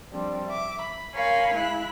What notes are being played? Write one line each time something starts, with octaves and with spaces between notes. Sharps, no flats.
F3 G3 C4 D4
E5 D6
B5
A#4 C#5 F5 G#5 B5 C6
G#3 E4 B5 F#6